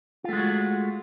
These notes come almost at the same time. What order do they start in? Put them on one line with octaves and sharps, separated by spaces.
F4 A3 G#3 F#4